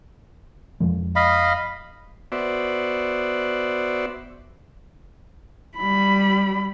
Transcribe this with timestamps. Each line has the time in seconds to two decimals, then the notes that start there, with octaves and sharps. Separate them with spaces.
0.80 F2 F3 G#3
1.16 D#5 F5 B5
2.32 B3 F#4 C5 D5 E5
5.78 G3 B5